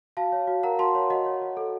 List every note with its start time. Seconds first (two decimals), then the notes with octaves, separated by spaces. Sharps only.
0.17 F#4 F5 A5
0.32 C#5
0.47 F#4
0.63 A#4 F#5 A#5
0.79 F#4 A5 C6
0.95 C#5
1.10 F#4 D#5 F#5
1.26 C#5
1.41 F#4
1.57 A4